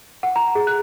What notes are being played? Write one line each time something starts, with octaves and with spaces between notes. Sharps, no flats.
F#5
A#5
G#4
F#6